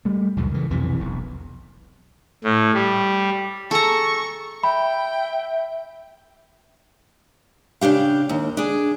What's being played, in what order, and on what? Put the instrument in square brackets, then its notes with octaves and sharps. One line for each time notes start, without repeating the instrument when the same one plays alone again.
[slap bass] G3 A3
C#2 F#2 A#2
C#3 E3
B1 F2 C3 E3
E1 B1
[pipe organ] A2
G3
[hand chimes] G#4 G#5 E6 [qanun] A4 A#5 [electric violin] C#6
[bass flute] E5 [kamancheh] G5 [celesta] B5
[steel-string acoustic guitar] C#3 D4 G4 F5
D#2
D4 G#4